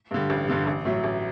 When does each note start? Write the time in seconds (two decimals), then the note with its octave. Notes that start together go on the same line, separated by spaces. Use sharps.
0.11 G2 D3 G3
0.30 A1
0.48 G2 D3 G3
0.67 A1
0.85 A2 F#3
1.04 A1